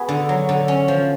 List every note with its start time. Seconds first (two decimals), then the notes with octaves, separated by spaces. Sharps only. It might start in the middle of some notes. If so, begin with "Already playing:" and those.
Already playing: B3 F#4 G#4 B4 F#5
0.09 D3
0.29 F#3
0.49 D3
0.68 C#4
0.88 F3